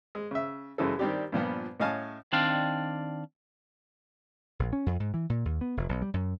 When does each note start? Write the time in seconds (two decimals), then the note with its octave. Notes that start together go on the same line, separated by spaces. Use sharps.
0.15 G#3
0.31 C#3 E5
0.78 F#2 C#3 E3 G#3 A4
0.99 D#3 G3 C4 D4 G4
1.32 G2 A#2 F3 B3
1.80 A2 C#4 D#5 F5 G#5 A5
2.32 D#3 C4 D4 D5 F5
4.59 A#1
4.73 C#4
4.86 F2
5.00 G#2
5.14 E3
5.30 A#2
5.45 D#2
5.61 B3
5.77 F1
5.89 B1
6.02 G3
6.14 F#2